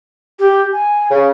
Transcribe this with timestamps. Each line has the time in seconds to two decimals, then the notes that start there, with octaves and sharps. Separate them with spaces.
0.39 G4
0.72 G#5
1.10 C#3